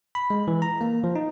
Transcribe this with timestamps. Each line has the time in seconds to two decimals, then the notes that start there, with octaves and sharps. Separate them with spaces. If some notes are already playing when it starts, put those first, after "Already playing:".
0.15 B5
0.30 G#3
0.48 E3
0.62 A#5
0.81 A#3
1.04 F3
1.16 D#4